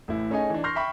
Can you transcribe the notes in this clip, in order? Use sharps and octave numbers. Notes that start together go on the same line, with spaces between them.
A1 A2 E4
A3 C#4 D#4 G#4 D#5 G#5
E3 D4
C6 C#6 F6 G6 A#6 C7
E5 G5 B5 C#6